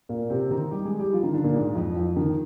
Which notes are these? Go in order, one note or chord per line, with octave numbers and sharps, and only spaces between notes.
A#2 A#3
C3 C4
D#3 D#4
G3 G4
G#3 G#4
G3 G4
F3 F4
D#3 D#4
D3 D4
A#2 A#3
G#2 G#3
F2 F3
F2 F3
D#3